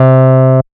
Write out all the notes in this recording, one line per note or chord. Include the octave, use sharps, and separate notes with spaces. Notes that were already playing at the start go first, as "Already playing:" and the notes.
Already playing: C3